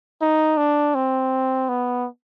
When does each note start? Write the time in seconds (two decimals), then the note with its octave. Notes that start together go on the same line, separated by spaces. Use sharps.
0.21 D#4
0.57 D4
0.95 C4
1.69 B3